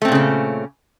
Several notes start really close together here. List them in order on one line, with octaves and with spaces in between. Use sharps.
A3 C4 A#2 C#3 C#4